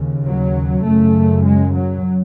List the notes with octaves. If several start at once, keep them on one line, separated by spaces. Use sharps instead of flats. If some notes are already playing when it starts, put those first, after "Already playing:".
Already playing: D#2 C#3
F#3
F#2 C#3 A3
G#3
F#3